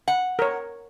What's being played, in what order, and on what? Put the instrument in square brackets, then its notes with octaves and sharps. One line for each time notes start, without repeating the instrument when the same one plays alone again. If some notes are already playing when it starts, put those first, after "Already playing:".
[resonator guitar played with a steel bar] F#5
[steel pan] A#4 C#5